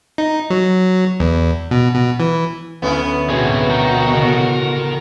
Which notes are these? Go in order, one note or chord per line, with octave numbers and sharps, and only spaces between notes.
D#4
F#3
E2
B2
B2
E3
D2 B3 C#4 E4
B2 C4 F#4 G#4 B4 D5
A#4 G5
A1 C#3